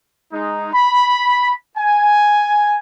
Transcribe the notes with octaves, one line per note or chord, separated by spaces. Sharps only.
G#3 D#4
B5
G#5